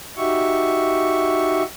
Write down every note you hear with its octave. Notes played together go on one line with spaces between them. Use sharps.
D#4 F#4 G4 E5 C#6